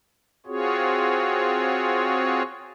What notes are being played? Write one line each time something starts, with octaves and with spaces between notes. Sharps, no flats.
C4 F4 F#4 G#4 C#5